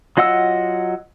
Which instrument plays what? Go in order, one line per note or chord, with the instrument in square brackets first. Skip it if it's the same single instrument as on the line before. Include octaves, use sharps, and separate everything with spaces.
[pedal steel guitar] F#3 F4 D#5 F#5 E6